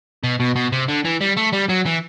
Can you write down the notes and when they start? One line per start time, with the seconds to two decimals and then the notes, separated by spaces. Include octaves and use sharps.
0.23 B2
0.40 B2
0.56 B2
0.72 C3
0.88 D3
1.05 E3
1.21 G3
1.37 A3
1.52 G3
1.69 F#3
1.86 E3